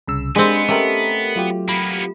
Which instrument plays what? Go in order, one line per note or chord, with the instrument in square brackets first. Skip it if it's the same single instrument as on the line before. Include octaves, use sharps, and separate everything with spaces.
[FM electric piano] C2 C#3 E6
[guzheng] G#3 C4 [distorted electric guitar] B3 [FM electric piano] D4 G4 G#4
[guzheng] A3 [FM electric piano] C#4 G4 A#4
[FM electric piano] F#3 F4 G4
[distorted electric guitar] A#3 B3 [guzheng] B5